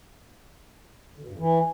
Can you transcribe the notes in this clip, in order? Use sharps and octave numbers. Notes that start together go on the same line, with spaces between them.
D3
B2
G2
F2
E3